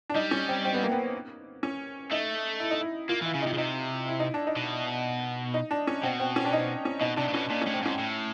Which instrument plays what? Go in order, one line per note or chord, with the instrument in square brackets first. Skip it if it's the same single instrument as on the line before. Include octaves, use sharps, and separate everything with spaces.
[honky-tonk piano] D4
[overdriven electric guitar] G3 [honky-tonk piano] D#4
[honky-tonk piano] C#4
C4
C4
B3
A#3
B3
C#4
[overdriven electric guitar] A3 [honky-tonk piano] D#4
[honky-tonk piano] E4
D#4
E4
[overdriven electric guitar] A#3 [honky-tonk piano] F4
[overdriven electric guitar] E3
[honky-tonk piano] E4
[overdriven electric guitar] C#3
[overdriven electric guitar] C3 [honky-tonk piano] D#4
[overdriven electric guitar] C#3
[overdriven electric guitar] C3 [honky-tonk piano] D#4
[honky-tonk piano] E4
D#4
D4
D#4
[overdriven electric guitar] B2
[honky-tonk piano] D#4
D4
C#4
[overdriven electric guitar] B2 [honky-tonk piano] C4
[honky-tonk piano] C4
C#4
D4
D#4
C#4
[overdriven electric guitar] B2 [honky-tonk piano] D#4
[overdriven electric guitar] C3 [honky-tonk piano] D4
[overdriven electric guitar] A#2
[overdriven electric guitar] B2 [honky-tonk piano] C#4
[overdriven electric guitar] A#2 [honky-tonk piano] D4
[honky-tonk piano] C#4
[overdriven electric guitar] A2
[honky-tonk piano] C4
[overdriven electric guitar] G#2 [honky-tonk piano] C#4
[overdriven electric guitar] A2